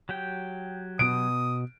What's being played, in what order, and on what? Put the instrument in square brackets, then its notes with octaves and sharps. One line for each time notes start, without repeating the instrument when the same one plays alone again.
[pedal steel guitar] F#3 G4 G5
[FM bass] B2 [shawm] D#6 [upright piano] D7